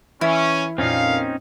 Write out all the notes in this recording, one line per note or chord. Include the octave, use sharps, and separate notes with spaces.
E3 C#4 E4
F2 A#2 C4 C#4 D#4 F5